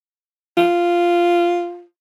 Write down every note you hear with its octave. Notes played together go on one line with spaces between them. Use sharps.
F4